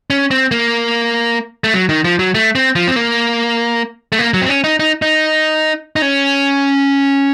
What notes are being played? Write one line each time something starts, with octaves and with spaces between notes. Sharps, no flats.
C#4
C4
A#3
A3
F#3
D#3
F3
F#3
A3
C4
F3
C4
A#3
A3
A#3
F#3
C4
C#4
D#4
D#4
D#4
D#4
C#4